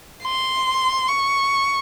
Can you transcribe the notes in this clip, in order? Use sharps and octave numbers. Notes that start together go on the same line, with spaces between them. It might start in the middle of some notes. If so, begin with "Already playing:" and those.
C6
C#6